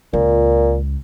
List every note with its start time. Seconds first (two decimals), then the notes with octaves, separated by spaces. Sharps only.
0.13 C#2 A#2